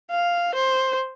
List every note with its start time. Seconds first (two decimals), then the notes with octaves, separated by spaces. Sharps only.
0.10 F5
0.55 C5